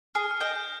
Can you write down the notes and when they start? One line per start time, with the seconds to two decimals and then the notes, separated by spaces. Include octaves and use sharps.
0.15 G#4 F6
0.31 F6
0.40 D#5 G5 G6